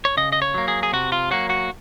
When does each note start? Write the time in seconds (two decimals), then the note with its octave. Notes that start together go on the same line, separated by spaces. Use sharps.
0.05 C#5
0.17 C#3 D#5
0.32 D#5
0.42 C#5
0.54 F#3 A#3
0.68 G#4
0.83 G#4
0.93 C3 F#4
1.12 F4
1.31 F#3 A#3 F#4
1.50 F#4